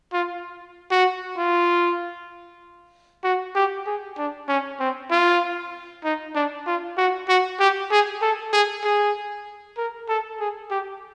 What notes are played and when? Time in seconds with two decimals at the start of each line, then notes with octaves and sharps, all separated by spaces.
0.13 F4
0.91 F#4
1.37 F4
3.24 F#4
3.55 G4
3.86 G#4
4.17 D4
4.48 C#4
4.80 C4
5.11 F4
6.04 D#4
6.35 D4
6.67 F4
6.98 F#4
7.28 F#4
7.59 G4
7.91 G#4
8.22 A4
8.53 G#4
8.84 G#4
9.77 A#4
10.08 A4
10.40 G#4
10.71 G4